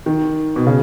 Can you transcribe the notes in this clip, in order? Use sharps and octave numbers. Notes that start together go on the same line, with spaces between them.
D#3
B2
C#3